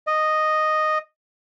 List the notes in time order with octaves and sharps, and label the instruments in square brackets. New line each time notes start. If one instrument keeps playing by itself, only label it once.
[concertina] D#5